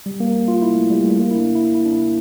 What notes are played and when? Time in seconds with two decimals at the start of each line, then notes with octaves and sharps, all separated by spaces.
0.06 G3
0.20 A#3
0.48 F4
0.62 E4
0.76 A3
0.90 G3
1.04 A3
1.18 A#3
1.31 E4
1.37 D4
1.55 E4
1.75 E4
1.85 D4
1.93 E4